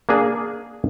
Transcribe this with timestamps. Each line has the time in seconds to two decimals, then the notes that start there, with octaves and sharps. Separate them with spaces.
0.09 A#3 D4 G#4